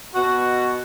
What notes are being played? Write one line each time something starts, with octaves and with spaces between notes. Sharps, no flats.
B2 F#4